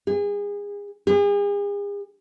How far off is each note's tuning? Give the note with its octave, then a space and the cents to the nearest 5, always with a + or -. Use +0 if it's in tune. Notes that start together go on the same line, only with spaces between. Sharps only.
G#4 -30
G#4 -40